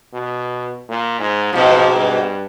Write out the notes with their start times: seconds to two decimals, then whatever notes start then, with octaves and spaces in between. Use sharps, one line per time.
0.14 B2
0.89 A#2
1.19 G#2
1.53 G#2 B2 F3
1.96 G2